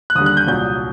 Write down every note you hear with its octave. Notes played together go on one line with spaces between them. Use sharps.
F#6
D#2 D3 G3 D#6
F#6
G6
C2 A#2 F#3 G6